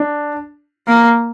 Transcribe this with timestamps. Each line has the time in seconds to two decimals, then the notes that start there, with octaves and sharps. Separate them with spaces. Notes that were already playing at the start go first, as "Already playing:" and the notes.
Already playing: D4
0.88 A#3